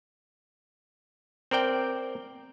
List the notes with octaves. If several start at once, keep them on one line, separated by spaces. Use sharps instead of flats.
C4 A#4 D5 G5